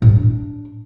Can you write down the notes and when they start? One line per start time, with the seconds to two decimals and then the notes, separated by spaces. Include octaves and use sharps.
0.02 A2
0.09 F#3
0.16 D4